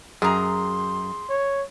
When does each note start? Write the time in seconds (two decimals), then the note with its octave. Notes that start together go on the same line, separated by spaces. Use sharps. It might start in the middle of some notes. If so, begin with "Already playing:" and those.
0.22 F#2 G#4 A#5 C6
1.30 C#5